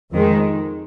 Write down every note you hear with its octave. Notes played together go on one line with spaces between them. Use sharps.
F2 D#3 G#3